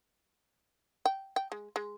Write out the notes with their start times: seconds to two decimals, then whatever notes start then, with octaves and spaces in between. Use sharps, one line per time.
1.05 G5
1.36 G5
1.52 G#3
1.76 G#3